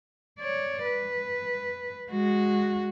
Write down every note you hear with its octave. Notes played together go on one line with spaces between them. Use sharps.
C#5 D5
B4
G#3 F#4